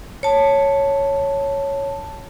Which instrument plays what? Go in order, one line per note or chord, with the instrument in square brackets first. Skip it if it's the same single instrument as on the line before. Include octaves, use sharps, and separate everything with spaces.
[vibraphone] C#5 A5